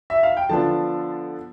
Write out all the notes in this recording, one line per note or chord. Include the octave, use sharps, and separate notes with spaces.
E5
F5
G5
D3 F3 B3 D4 F4 A5